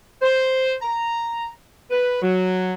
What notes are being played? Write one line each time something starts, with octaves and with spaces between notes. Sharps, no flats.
C5
A#5
B4
F#3